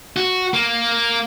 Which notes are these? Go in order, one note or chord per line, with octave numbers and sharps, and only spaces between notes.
F#4
A#3